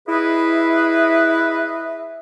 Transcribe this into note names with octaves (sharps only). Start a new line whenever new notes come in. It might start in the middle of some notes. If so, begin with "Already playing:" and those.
E4 G#4 B4 D#5 E5